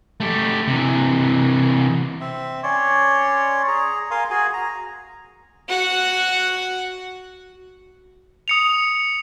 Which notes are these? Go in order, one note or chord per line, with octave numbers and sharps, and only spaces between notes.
A3 G4
C3 E3
C4 E5
C#4 C#5 D5 C6
G#4 A#5
A#4 F5 G#5 C6
F#4 G#4 G#5
A#5
F#4 F#5
D#6 C#7 F7